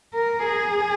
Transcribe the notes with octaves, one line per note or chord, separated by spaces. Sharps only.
A#4
G#4